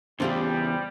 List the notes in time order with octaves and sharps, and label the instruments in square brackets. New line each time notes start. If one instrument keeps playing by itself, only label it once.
[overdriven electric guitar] E2 [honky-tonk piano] C#3 A3 [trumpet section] G3 [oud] C4 F4 G4